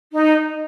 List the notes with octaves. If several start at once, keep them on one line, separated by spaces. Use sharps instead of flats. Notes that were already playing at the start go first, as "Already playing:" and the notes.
D#4